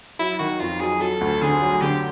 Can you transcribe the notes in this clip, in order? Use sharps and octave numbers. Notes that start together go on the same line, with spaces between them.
F#3 E4
D#3 F#4
F2 F4
F#3 G#4
F#3 A4
D2
D3 G#4
F#3
D3 G4